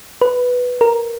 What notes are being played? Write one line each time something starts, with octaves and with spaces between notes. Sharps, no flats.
B4
A#4